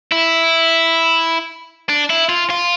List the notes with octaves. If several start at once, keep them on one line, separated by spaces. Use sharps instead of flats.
E4
D4
E4
F4
F4